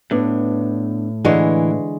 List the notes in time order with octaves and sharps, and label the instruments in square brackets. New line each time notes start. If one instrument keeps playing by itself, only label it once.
[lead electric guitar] A2 [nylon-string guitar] B3 D4
[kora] D3 G#3 C#5 [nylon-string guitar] E3